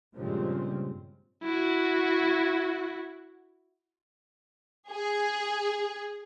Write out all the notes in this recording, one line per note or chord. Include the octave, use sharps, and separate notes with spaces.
G2 A#2 C#3 F3 G#3 C4
E4 F#4
G#4